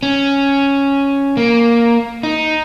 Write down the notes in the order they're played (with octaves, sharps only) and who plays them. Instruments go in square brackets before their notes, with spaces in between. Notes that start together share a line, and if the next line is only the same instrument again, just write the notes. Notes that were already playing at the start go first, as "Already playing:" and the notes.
[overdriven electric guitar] C#4
A#3
D#4